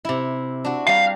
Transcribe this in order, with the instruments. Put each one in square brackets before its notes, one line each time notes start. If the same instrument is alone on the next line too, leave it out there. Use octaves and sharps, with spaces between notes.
[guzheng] C3 E4
D4 F#4
[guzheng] G3 A#5 [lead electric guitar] F5